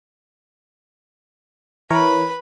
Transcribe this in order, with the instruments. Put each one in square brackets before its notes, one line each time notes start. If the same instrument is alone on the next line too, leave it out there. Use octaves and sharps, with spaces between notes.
[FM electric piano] E3 A#4 C#5 [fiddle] B4 B5